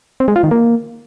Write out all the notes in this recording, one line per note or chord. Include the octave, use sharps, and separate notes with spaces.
C4
G#3
F4
D#3
A#3